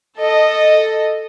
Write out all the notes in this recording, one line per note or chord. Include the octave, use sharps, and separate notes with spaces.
A4 D#5